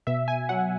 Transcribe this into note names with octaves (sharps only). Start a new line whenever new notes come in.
B2 E5
G#5
F#3 F#5